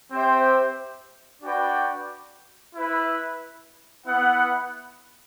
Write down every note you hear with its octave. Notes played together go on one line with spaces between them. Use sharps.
C4 G4 C5 E5 G5
D4 F#4 B4 D5 G5
E4 B4 E5
B3 E4 B4 F#5